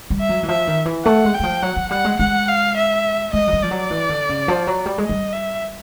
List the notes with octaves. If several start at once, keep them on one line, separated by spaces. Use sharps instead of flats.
G3
E5
F#3
E3
F3 E5
D#3
E3
A3 F#5
G#3
G5
E3
F3
F#3 F#5
F#3
G3 F#5
G#3
G#3 F#5
F5
E5
G#3 D#5
F#3
G3
F3 D5
F#3
E3
D3
C#3
F3
F#3
G3
G#3
G3 D#5
E5